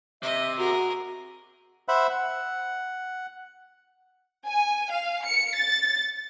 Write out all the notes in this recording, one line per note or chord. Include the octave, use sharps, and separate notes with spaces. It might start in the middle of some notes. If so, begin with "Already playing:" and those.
C3 D#5 E5
F#4 G#4 A#4
C5 E5 F#5 B5
F#5
G#5
F5
C#7
A6